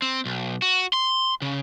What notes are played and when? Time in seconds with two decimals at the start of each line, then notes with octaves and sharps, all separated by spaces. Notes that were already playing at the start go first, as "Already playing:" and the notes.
0.02 C4
0.25 B1
0.62 F#4
0.93 C6
1.42 C#3